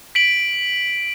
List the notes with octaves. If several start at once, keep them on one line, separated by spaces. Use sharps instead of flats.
B6 D7 F#7